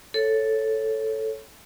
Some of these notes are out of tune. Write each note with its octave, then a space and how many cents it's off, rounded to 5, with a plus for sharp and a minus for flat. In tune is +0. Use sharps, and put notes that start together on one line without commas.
A4 +0 C#5 +0